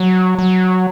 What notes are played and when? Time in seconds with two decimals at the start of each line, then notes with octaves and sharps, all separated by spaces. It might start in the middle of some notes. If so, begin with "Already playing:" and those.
Already playing: F#3
0.39 F#3